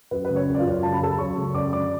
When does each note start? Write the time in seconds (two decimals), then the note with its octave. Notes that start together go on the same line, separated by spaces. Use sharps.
0.11 F#2 B4
0.25 C#3 B4
0.35 C#4 C#5
0.48 F#2
0.55 D5
0.59 F4 F5
0.66 F#2
0.83 C#3 A5
0.93 B5
1.01 F#2 A4 A5
1.19 F#2 C#5 C#6
1.37 C#3
1.54 F#2 D5 D6
1.73 D3 D5 D6